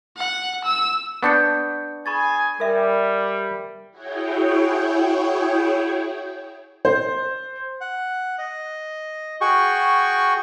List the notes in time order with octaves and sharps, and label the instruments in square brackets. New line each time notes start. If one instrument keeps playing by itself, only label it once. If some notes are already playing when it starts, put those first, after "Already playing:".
[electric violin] F#5
E6
[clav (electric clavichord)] B3 D4 [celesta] C#6 G6 C#7
[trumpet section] G#4 G#5 [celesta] B5 C#6 A6
[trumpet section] G3 [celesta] A#4 E5
[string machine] E4 F#4 G#4 C#5 G5
[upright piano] C5
[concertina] F#5
D#5
F#4 G#4 G5 C#6